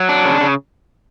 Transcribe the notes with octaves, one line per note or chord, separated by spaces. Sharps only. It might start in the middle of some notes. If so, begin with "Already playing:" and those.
Already playing: F#3
D4
C#3
C#3